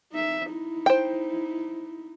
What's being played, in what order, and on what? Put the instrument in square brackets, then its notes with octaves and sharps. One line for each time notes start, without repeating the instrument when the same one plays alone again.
[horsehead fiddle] D#4 E5
D#4 E4
[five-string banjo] C5 G5